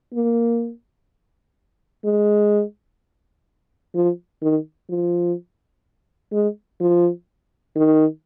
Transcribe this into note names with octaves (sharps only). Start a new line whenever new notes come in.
A#3
G#3
F3
D#3
F3
G#3
F3
D#3